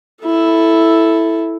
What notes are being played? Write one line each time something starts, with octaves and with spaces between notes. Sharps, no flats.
E4 A4